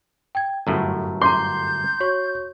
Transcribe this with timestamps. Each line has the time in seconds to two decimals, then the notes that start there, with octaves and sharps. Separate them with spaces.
0.35 G5 G#6
0.67 G1 F#2 A2 A#5
1.22 A#5 C6 D6 G6
2.00 F#4 C#5 C#6